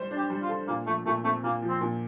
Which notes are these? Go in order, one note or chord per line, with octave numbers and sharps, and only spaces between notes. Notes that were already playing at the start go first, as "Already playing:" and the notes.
Already playing: G3 C5
D4
G4
G3
F4
A4
A#2 A#3
F3 A3
A#2 A3
A3 C4
A#2 A#3
F3
C4
A#2